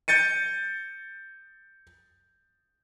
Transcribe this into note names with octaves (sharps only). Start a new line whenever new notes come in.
G6 A6 C#7 D#7